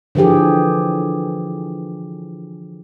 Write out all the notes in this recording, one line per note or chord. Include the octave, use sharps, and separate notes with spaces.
D3 E3 F3 G4 G#4